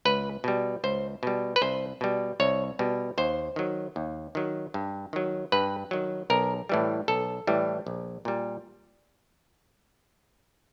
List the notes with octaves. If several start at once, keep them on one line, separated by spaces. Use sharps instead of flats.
C#2 B4
B2 G3
C#2 C5
B2 G3
B4
C2 C5
B2 G3
C2 C#5
B2 G3
D#2 C5
D#3 F#3
D#2
D#3 F#3
G2
D#3 F#3
G2 B4
D#3 F#3
B1 A#4
A2 E3 G3
B1 A4
A2 E3 G3
A#1
A#2 G3